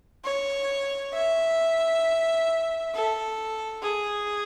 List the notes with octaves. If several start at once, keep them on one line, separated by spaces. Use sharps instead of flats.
C#5
E5
A4
G#4